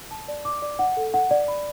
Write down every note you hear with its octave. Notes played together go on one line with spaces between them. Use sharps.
A5
D5
D6
D5
F#5
A4
F#5
D5
B5